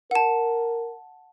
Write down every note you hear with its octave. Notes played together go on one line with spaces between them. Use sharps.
A#4 F#5 A5